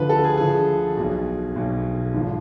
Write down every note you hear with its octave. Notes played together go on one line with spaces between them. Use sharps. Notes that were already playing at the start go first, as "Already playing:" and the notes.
Already playing: D2 D3 F3 B4
A4
G#4
D2 D3 F3 G#4
B1 B2
B1 B2
G#1 G#2 F3